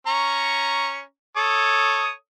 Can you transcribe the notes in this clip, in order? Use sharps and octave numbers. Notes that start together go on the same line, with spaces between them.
C#4 A#5 C#6
A4 C#5 D#6